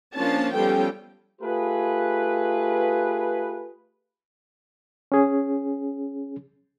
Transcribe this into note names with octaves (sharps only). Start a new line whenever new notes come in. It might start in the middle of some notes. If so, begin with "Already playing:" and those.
F3 A#3 C#4 D4 A5
F3 G3 B3 C#4 A4 G5
A3 F4 G4 G#4 B4
C#4 G#4